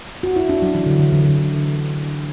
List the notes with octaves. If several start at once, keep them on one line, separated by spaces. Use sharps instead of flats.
F#4
E4
D4
F#3
E3
D3
D3
D3
D3